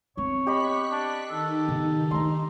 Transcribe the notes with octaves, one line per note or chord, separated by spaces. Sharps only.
B3 C4 C#5
G4 D#5 B5 C#6 F#6 B6
D4
D#3 D#4 A4
C#3 B3
A3 D4 A#5 C6